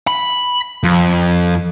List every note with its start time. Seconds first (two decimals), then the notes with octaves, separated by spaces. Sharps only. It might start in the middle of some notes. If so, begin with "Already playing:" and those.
0.07 B5
0.84 F2